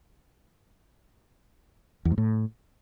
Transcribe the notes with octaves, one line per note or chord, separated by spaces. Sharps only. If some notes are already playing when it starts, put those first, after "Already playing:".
E2
G#2
A2